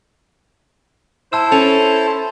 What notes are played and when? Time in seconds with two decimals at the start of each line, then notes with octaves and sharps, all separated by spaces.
1.32 E4 C5 A5 E6 E7
1.52 C#4 A4 F7